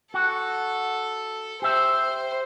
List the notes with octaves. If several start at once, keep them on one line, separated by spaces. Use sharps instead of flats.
F#4 A4
G4 C5 E5